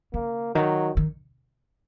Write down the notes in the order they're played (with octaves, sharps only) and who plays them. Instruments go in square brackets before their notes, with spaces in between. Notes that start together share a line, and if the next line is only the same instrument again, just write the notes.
[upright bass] C#3 [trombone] A#3
[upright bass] D#3 [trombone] F#3
[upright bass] D#3